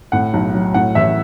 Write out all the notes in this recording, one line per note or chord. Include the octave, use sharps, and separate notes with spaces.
A2 F#5
B1
F#3
A2 F#5
A1 E5